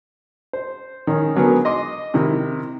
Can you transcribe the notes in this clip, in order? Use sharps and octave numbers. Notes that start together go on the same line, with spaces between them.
C5
D#3 C#4 G#4
D3 F#3 B3 G#4 A#4
D#5 C6 D6
C3 D#3 E4